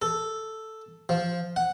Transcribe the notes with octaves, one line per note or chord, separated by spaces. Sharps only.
A4
F3
F#5